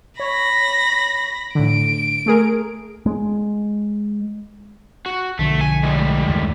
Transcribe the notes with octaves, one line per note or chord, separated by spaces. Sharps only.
C#5 B5 A#6
A2 D3 D7
A3 G#4 A#4
G#3
F#4
B1 D3 F3 A3
G#5
A2 G3 G#3
F#1 D#2